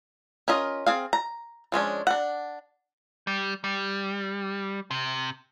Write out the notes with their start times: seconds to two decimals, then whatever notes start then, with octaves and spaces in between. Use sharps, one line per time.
0.48 C#4 F4 A#4 D#5
0.87 C4 G#4 F5
1.13 A#5
1.72 F3 G#3 C#4 D4
2.07 D4 F#5
3.27 G3
3.64 G3
4.91 C3